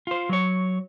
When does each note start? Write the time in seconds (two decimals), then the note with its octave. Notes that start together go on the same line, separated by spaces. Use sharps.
0.07 F4 C5
0.29 F#3 C#5